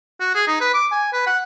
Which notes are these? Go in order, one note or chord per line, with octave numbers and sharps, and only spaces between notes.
F#4
G#4
D#4
B4
D6
G#5
B4
F#5